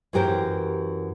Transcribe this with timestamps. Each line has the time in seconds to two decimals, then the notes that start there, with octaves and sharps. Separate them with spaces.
0.13 F#2 E3 G4 A#4 C5